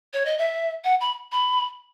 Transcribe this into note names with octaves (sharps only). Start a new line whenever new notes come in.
C#5
D#5
E5
F#5
B5
B5